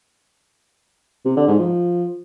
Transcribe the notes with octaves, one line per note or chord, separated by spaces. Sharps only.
C3
D3
G#2
F3